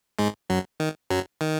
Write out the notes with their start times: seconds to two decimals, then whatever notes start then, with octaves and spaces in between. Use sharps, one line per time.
0.19 G#2 G#3
0.50 F#2 F#3
0.80 D#3
1.10 F#2 F#3
1.41 D#3